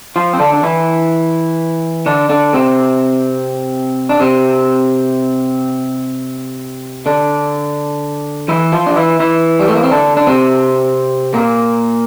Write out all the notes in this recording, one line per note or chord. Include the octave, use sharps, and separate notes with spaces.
F3 F4
C4
D3 D4
D4
E3 E4
D3 D4
D3 D4
C3 C4
D4
C3 C4
D3 D4
E3 E4
F3 F4
D4
E3 E4
E3 E4
G3
A3
A#3
C4
D3 D4
D4
C3 C4
A#2 A#3